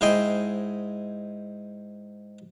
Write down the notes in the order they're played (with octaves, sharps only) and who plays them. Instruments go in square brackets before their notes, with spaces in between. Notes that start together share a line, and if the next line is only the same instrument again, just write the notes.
[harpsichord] G#2 E4 C5 D#5 G5 G#5